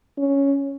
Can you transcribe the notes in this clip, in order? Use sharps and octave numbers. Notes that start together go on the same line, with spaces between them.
C#4